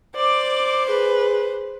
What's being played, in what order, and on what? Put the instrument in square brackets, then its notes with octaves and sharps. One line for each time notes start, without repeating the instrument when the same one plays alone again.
[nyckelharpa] C5 [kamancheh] D5 D6
[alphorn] G#4 [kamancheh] B4